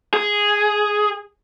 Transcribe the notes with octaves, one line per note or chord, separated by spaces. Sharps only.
G#4